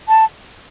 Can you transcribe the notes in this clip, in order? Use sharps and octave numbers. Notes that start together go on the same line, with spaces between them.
A5